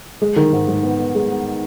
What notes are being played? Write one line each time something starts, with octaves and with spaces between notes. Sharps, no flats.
G#3
D#3
G#2
G#2
B3
B3
G#3
B3